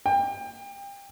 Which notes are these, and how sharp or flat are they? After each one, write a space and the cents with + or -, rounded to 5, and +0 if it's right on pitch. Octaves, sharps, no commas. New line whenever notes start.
G5 +30